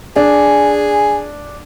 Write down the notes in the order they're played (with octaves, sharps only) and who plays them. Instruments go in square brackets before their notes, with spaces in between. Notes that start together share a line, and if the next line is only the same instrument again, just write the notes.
[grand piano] D4 [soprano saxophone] G#4 [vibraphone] G#5